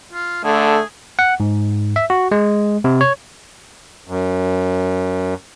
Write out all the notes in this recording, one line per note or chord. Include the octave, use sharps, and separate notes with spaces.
F4
D3 A3 G#4
F#5
G#2
E5
F#4
G#3
C3
C#5
F#2